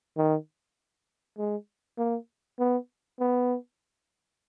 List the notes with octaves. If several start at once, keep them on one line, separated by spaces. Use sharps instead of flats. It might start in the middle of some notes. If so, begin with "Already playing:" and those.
D#3
G#3
A#3
B3
B3